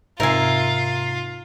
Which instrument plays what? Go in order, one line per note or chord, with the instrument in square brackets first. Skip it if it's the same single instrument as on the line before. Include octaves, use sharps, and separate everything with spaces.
[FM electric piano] G#2 C3 C7 [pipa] D#4 E5 [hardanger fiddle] F4 [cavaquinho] A#4 G#5